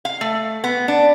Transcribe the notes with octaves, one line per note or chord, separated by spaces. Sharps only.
F5
A3
B3
D4